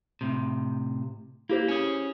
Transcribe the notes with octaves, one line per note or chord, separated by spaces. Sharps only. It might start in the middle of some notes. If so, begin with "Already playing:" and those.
A2 C3
A#3 E4 G4 C5
C#4 G#4